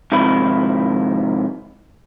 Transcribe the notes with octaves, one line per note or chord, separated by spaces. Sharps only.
G#2 C3 D#3 F3 E4 B5